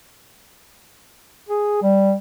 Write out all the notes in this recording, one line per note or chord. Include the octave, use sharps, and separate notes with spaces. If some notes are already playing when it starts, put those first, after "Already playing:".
G#4
G3